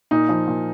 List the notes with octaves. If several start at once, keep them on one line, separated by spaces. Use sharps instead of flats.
A#2 D#4
F3
A#2